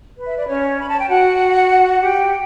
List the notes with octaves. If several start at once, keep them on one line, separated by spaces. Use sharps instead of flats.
B4
E5
D5
C#4 C#5
B5
A5
G5
F#4 F#5
G4 G5